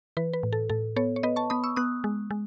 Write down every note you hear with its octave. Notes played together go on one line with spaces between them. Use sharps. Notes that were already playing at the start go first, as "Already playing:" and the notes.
E3 B4
B4
A2
A4
A2 A4
B3 A4 C#5
C#5
B3 B4 D#5
A5 C#6
B3 B5 D#6
C#6 E6
B3 D#6 F#6
G#3
G#3